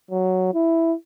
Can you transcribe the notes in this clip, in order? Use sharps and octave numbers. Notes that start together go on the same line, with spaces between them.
F#3
E4